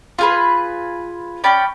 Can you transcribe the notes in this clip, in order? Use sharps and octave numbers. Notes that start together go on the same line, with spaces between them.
F4 G#4 B4
C#4 D5 G5 B5